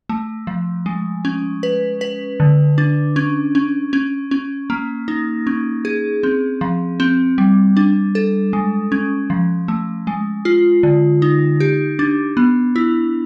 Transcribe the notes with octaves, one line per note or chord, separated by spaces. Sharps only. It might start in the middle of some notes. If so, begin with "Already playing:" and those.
A3
F3
G#3
C#4
B4
B4
D3
D4
C#4
C#4
C#4
C#4
A#3
D#4
C#4
G#4
C4
F3
C4
G3
D4
A4
G#3
C#4
F3
A3
G#3
F4
D3
D#4
G4
D4
B3
E4